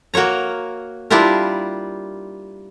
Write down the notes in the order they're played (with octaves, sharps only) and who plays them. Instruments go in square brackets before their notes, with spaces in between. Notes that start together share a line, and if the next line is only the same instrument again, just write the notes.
[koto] A#3 F#4 A#4 C#5 A#5
G3 D4 E4 F4 G4 A#4